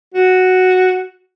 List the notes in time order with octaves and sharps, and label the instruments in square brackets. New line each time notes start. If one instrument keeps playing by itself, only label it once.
[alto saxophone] F#4